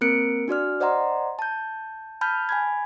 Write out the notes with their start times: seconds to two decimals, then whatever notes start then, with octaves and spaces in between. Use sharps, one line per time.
0.01 A#3 C4 A#4 F#6 C#7 D7
0.48 D4 F#4 D5 F6
0.80 C5 D5 D#5 F#5 A#5 C6
1.39 A5 G6
2.21 A5 B5 F6 G6
2.49 G#5 B5 G#6